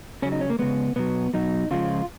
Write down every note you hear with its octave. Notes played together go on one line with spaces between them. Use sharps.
C#3 F#3 C#4
D#4
C#4
A#3
C#3 G#3 B3
B2 F#3 B3
B2 F#3 D#4
C#3 F3 G#3 F4